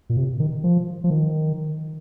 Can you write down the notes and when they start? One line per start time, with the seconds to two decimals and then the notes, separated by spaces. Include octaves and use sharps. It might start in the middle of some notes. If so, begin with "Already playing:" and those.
0.09 A#2
0.17 C3
0.39 D#3
0.64 F3
1.04 F3
1.10 D#3